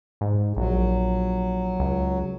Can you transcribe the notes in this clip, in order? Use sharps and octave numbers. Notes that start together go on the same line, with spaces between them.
G#2
A#1 F#3
C#2